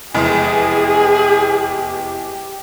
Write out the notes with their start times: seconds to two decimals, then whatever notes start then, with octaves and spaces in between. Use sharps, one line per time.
0.14 F1 E2 G#3 G4 G#4